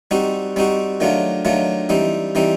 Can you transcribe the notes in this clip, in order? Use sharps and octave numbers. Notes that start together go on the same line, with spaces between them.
G3 C4 D#4 F#4
G3 C4 D#4 F#4
D#3 F#3 A3 D4 F4
D#3 F#3 A3 D4 F4
E3 G3 C4 D#4
E3 G3 C4 D#4